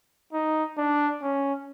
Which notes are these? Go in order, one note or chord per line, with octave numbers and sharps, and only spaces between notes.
D#4
D4
C#4